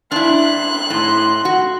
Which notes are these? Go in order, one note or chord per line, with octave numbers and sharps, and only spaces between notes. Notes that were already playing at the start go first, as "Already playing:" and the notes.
D4 E4 C6 F#6
A2
F#4